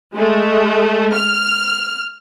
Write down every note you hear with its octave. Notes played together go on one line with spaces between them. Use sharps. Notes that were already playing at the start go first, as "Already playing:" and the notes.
G#3 A3
F6